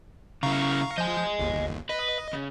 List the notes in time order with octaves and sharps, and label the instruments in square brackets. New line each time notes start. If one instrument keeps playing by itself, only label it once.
[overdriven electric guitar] C#3 E4 [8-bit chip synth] F5 A#5 C#6
[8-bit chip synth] F3 G6 [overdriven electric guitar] D#5 G#5
[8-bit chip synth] G1 D#2
[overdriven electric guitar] B4 [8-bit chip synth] D#5
[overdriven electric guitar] C#3